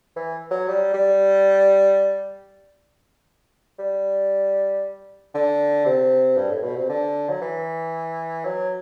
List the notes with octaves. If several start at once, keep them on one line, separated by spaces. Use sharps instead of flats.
E3
F#3
G3
G3
G3
D3
C3
G2
A2
B2
C3
D3
F#3
E3
F#3